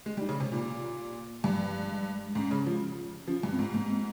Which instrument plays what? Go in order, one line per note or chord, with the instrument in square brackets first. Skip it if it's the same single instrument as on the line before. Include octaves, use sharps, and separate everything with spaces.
[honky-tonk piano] G#3
G3
[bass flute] D#4
[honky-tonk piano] C#3
C3
A#2
[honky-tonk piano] G2 [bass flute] F3
[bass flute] G3
F3
G3
G#3
G#3
[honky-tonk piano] G#2 [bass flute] C#4
[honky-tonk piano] C#3
F3
[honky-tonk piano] F3 [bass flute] C#4
[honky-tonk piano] G2
[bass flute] C4
[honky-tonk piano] G#2
[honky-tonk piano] G#2 [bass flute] A#3
[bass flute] C4